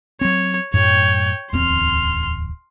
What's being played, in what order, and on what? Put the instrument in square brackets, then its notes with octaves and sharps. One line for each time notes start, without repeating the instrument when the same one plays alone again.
[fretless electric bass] F#3 C4 [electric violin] C#5
[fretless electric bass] F#2 A2 [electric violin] C#5 G5
[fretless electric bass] D1 E2 C4 [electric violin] C6 F6